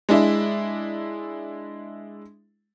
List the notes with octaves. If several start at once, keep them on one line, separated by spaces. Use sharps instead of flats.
G#3 D4 E4